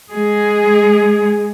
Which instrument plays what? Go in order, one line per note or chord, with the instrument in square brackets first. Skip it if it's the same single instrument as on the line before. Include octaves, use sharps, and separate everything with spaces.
[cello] G#3 G#4